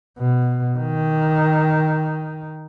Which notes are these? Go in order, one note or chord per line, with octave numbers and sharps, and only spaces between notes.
B2
D#3